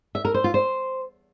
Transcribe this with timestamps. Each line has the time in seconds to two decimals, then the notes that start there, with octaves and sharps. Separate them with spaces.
0.15 E5
0.25 A#4
0.34 C5
0.44 F4
0.54 C5